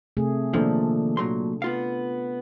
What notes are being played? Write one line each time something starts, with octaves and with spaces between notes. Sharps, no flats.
C3 A3 G#4
D#2 A#2 F3 D4 A4
A#2 F#3 C6
B3 F4 F5